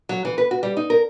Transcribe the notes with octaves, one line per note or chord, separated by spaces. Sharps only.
F#3
E3
B4
F#4
G3
D#4
A#4